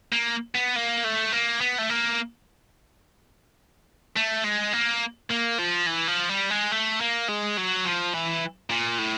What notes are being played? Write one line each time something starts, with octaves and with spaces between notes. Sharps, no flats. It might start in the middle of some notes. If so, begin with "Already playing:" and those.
A#3
B3
A#3
A3
A#3
B3
A3
A#3
A3
G#3
A#3
A#3
F3
E3
F3
G3
G#3
A3
A#3
G#3
F#3
F3
E3
A#2
A2